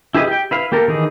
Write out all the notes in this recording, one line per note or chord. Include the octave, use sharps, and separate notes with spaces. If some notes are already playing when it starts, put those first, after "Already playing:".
E4 G4 G#4 B4 D#5
G4 G5
E4 B4 F5
A#3 G4 A4 A#4
D#3 E3 D#4 G#4